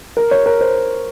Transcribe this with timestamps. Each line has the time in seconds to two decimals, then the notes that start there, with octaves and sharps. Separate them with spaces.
0.17 A#4
0.31 C#5
0.46 A#4
0.61 C5